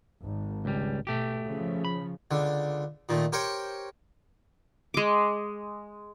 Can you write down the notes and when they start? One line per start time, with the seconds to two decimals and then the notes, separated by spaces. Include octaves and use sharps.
0.23 G#1
0.65 C#2 G3
1.07 B2 A3 G4
1.47 C#3 F3
1.85 B5
2.31 C#2 D3
3.09 A#2 D#3 A3
3.32 G4 A#4 C5 C#5 G5 C#6
4.94 G#3 D6